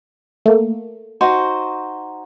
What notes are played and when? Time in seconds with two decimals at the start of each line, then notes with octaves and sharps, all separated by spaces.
0.46 A3 A#3
1.21 D#4 F#4 C5